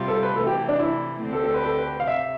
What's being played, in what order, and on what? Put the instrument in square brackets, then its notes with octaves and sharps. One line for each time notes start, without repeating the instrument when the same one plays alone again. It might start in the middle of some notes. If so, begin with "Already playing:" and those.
Already playing: [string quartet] C3 G3 C4 F4
[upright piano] A4
B4
[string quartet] C3 E3 A3 [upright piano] A4
[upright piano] G4
D4
E4
[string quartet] D2 D3 A3 C4 G4
[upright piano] A4
A4
B4
A4
B4
F5
[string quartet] C3 [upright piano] E5